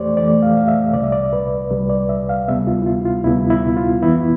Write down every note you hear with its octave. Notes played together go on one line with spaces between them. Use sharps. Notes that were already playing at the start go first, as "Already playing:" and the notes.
Already playing: F2 E3 A3 G4 C5 D5
F2 E3 A3 D5
F5
F5
E5
C2 C3 G3 D5
E5
D5
B4
C2 C3 G3 B4
D5
E5
F5
D2 C3 G3 B3 E5
F4
E4
F4
F4
D2 C3 G3 B3 E4
E4
F4
F2 E3 B3 E4